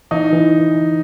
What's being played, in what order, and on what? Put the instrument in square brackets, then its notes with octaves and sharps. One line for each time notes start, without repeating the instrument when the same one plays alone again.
[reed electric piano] E3 [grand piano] D#4
[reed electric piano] E3